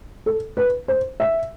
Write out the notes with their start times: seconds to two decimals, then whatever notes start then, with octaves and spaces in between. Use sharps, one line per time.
0.26 A4
0.57 B4
0.88 C5
1.20 E5